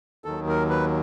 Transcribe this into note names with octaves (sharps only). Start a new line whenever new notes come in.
D#2 D#3 F#3 A4
A#4
B4